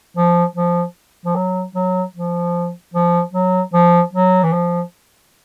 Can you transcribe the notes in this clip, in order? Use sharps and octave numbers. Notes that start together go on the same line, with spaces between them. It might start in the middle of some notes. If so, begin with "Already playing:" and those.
F3
F3
F3
F#3
F#3
F3
F3
F#3
F3
F#3
E3
F3